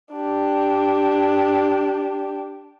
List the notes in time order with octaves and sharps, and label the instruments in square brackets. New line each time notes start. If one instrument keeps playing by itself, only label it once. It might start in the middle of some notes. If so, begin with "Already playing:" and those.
[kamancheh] D4 G4